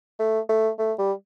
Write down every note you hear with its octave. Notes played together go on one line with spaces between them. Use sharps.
A3
A3
A3
G3